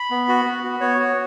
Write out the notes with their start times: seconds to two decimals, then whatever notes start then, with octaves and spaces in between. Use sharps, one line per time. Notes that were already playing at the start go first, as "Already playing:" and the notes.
Already playing: B5
0.11 B3
0.29 F#4
0.45 B3
0.63 F#4
0.81 B3 C#5
0.99 F#4